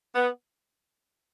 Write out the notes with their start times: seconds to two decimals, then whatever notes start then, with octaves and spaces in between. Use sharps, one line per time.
0.15 B3